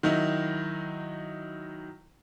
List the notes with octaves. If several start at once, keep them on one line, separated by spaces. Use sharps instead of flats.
D#3 F#3 D#4 E4